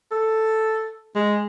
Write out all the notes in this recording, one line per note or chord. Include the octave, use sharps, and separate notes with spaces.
A4
G#3